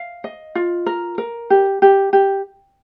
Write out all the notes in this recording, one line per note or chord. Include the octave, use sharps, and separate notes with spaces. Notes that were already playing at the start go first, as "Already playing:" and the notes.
Already playing: F5
D#5
F4
A#4
A#4
G4
G4
G4